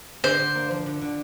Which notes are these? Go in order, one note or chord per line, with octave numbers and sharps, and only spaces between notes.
D3 C5
D3
A#3
F3
D3
D3